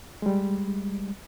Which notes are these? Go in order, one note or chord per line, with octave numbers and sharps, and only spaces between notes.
G3 G#3